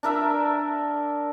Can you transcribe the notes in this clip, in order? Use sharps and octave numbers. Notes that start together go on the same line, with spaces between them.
D4 A#4 E5